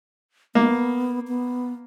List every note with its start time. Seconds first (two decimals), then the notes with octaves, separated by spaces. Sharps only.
0.55 A#3 B3
1.28 B3